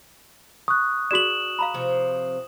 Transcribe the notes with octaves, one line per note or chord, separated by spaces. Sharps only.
C#6 D#6 F#6
F#4 G#4 D5 E7 F#7
F5 A#5 B5
C3 F3